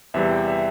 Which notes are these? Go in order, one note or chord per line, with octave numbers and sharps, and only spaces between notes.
E2 C3 E3 G3 E5
G5
E5